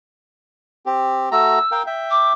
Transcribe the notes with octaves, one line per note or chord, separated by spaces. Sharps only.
C4 G4
A3 F#4 A#5 E6
A#4 F5 G5
E5 G5
D6